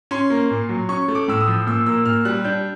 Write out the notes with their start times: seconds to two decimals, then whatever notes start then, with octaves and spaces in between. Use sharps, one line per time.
0.11 C#4 C6
0.30 A#3
0.50 A#2
0.69 F#3
0.89 C#4 C#6
1.08 A3
1.15 D6
1.28 A2 E6
1.41 D#6
1.48 F3
1.67 A#2 E6
1.86 A#3 E6
2.06 A#2 F6
2.25 G3 F#6
2.44 D4 G6